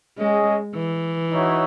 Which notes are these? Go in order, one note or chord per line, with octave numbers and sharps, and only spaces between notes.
G#3 C#4 G#4 D#5
E3
D#4 F#4 C#5 E5